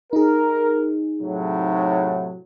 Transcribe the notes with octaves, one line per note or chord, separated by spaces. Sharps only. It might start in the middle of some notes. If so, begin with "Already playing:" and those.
D#4 G#4 A#4
A2 C3 F#3